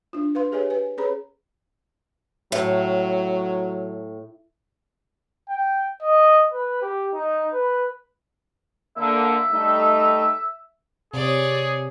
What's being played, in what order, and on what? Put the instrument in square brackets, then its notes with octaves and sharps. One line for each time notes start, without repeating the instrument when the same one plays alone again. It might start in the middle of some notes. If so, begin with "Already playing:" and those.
[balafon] D4 F4
B4 F5 C6
G4 G#4 B4 C#5 E5 G#5
B4 G#5
C#4 G#4 B4 C#5 A#5 B5
[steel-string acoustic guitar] A2 [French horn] F#3
[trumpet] G5
D#5
B4
G4
D#4
B4
[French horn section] D3 A#3 [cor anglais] E5
[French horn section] G3 A3 D#4
[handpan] C3 [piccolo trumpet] G#4 [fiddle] C#5 D5